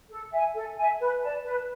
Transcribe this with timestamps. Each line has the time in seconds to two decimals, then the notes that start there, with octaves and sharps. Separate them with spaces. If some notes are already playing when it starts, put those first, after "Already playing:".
0.10 A4
0.32 E5 G#5
0.54 A4
0.77 E5 G#5
1.00 B4
1.22 D5 A5
1.44 B4